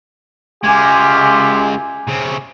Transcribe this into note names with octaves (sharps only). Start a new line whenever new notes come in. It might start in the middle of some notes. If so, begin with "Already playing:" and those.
C#2 F#2 G#3 F4 G4 G#5 D6 G#6
C#3 C4